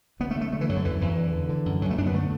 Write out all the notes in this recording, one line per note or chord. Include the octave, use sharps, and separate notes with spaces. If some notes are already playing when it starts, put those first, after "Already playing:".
D3 B3
A3
D3
A3
D3 A3
E3
F#2 F#3
D3
E2 E3
E2 E3
D3
D3
D3
F#2
F#2 F#3
A3
F#2 D4
B3
D3 A3